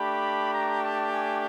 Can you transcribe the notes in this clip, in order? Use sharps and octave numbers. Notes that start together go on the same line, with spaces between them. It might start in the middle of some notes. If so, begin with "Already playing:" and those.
Already playing: A3 D4 G4 B5
A#5
A5
G#5